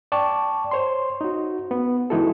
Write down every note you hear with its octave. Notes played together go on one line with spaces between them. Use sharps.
D5 G5 A5 C#6 D6
C5 C#5 C6
D#4 F#4
B3
E3 G#3 D#4 E4 F#4 A4